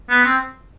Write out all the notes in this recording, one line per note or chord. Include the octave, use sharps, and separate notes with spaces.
B3
C4